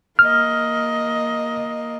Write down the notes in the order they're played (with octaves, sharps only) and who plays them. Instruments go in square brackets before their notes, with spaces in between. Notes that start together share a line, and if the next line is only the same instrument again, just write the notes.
[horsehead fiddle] A#3 D#5 [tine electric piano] F6